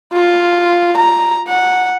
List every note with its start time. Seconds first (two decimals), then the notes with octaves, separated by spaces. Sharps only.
0.13 F4
0.97 A#5
1.48 F#5